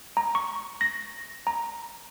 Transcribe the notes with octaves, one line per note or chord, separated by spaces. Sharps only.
A#5
C#6
A#6
A#5